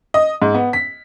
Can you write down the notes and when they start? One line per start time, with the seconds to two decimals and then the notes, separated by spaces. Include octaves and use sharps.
0.14 D#5
0.42 G#2
0.54 B3
0.73 B6